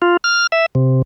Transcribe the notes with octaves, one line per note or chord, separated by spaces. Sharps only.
F4
F6
E5
C3